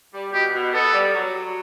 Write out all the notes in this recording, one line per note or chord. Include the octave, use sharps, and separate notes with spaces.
G3
B2 G4
B2
B3 A4
G3
F#3
F#3